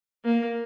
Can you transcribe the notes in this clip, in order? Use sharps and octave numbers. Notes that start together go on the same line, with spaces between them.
A#3